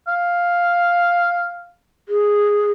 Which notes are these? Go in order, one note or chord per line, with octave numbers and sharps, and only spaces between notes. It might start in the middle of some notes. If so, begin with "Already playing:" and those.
F5
G#4